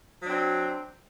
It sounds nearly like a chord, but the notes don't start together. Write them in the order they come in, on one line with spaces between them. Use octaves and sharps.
F#3 D4 C4